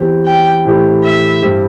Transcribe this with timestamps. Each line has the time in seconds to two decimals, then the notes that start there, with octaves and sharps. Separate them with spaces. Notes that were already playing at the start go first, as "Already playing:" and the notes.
Already playing: E2 E3 C4 G4
0.26 G5
0.65 A2 E3 C4 E4 G4
1.04 E5
1.42 G2 G3 C4 E4